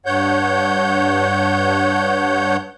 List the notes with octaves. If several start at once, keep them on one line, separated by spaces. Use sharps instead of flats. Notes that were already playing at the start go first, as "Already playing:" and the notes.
G2 C#5 F#5 G6